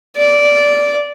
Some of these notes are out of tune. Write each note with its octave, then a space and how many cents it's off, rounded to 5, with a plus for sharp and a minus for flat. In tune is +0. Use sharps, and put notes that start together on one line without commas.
D5 -10